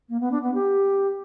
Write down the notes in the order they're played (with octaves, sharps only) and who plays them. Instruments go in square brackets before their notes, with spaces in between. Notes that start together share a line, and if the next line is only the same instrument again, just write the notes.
[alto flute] A#3
B3
D4
B3
G4